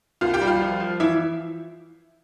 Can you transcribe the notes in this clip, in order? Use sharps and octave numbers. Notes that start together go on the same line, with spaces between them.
C2 F4 F5
G4 G5
G3
F4 F5
F3
F3
E3 E4 E5